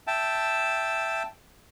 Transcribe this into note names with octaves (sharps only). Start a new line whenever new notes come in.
E5 G5 A5